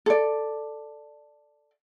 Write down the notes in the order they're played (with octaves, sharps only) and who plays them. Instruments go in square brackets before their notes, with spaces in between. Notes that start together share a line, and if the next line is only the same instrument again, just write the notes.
[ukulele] A4 D5